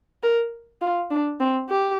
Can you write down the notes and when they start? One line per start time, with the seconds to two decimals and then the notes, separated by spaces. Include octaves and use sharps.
0.23 A#4
0.81 F4
1.10 D4
1.40 C4
1.69 G4